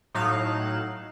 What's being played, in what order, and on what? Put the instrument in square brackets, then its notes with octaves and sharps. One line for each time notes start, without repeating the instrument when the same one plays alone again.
[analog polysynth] A2 F#3 D#4 F5 F#6 E7